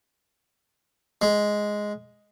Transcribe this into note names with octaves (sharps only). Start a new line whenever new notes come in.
G#3